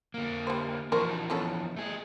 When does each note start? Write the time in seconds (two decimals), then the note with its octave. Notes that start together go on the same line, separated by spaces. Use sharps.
0.14 D3 A#3
0.47 G3 C5
0.92 E3 F3 D4 F#4 A#4 C5
1.30 B3 C#4 A4
1.76 A3 G#4